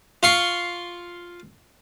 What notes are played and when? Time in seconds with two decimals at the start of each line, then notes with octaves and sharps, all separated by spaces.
0.23 F4 C6 C#6